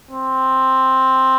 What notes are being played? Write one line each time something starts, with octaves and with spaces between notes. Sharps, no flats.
C4